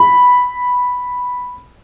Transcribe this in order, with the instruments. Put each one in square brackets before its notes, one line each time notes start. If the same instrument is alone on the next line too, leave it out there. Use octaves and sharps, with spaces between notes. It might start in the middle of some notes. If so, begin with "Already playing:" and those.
Already playing: [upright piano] B5